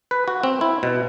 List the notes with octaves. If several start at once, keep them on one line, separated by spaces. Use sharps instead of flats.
B4
F#4
C4
E4
B2